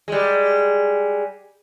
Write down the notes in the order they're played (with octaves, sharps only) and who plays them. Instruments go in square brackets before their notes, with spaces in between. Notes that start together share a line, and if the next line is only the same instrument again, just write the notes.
[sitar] G3 G#3